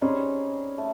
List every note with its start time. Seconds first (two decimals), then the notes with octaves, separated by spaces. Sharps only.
0.01 G3 C4 C#4 D#4 G#4
0.78 A3